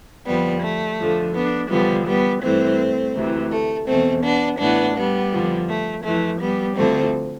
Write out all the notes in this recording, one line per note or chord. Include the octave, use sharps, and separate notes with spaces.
F2 D3 F3 G3 B3
A3
F2 D3 F3
B3 D4
E2 D3 F3 G3 B3
G3 B3
G2 E3 A3 C4
D2 C3 E3
A3
E2 B2 A3 C4
B3 D4
A2 E3 B3 D4
G3 B3
F2 D3 F3
A3
F2 E3 A3
G3 B3
D2 D3 F3 A3 C4